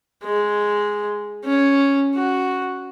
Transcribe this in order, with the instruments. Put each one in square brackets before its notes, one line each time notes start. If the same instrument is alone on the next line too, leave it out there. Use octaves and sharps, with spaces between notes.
[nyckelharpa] G#3
C#4
F#4